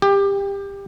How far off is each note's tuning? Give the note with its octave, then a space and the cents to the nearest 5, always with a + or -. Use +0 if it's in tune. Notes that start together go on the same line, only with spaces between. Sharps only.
G4 +20